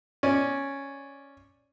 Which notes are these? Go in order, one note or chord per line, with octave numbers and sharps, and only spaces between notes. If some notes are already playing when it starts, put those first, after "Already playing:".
C#4 D5